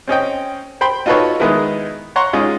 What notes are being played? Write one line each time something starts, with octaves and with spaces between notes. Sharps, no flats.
C4 C#4 D#5 G5
C5 G5 B5 C6
D#4 F4 F#4 A4 B4 C#5
D#3 G#3 B3 D#4 E4 A#4
C#5 F#5 A#5 C6 C#6
G#3 C#4 D#4 F4